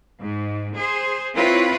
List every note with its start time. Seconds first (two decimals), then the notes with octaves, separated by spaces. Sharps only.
0.21 G#2
0.75 G#4 C5
1.35 C4 E4 F4 B4 C#5